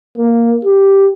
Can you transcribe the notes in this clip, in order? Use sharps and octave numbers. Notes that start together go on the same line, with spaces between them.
A#3
G4